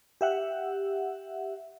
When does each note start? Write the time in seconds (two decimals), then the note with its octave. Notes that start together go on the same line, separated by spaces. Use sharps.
0.21 G4 E5 F#5